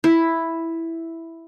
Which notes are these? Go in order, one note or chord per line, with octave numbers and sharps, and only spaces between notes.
E4